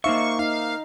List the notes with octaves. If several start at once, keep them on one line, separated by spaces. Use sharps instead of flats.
A#3 D#4 C5 E5 F5 C#6
D#4 F5